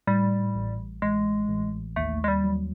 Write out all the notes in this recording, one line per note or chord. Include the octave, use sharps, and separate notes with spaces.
A2 G3
A1
A1 G#3
A1
D#2 A3
G#3
G3
F#3